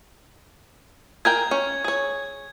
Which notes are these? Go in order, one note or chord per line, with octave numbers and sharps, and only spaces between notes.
G#4 A#4 G5 G#6
C#4
G#4 C#5